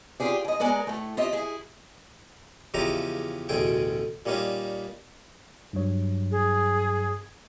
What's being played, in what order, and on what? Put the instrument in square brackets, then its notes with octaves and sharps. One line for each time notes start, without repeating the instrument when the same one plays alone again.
[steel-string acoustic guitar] F4 G4 G#4 D5
D#2 D#5
G#3 B3 A#4 D5
A2 A3
F4 G4 D#5 E5
E4 G#4
[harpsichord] E2 C#3 F3 G4 D#5 A#5
A1 D2 B2 G#4 G5
A#2 G3 A#3 C#4 D#4
[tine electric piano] G2 F#3 C#5
[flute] G#4